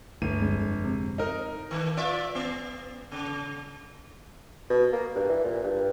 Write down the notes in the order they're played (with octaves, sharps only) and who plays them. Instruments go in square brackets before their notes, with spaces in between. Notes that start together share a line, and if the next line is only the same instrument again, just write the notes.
[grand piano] G1 D#7 [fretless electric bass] D2
[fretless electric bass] F2 G#3 D4
[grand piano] C3
D#4 A#4
[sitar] D#3
F4 D5 E5
B3
C#3
[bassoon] B2
A#3
G2
E3
A#2
G2